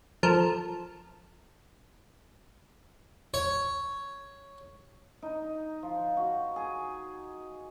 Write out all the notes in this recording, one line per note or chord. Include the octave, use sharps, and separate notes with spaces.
F3 A4 A#4
C#5
D#4
F3
F#4
G#4